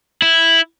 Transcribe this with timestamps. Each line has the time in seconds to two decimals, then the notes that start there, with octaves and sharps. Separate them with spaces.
0.22 E4